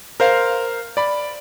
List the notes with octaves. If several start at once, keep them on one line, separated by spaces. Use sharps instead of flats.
A#4 C5 F5
D5 B5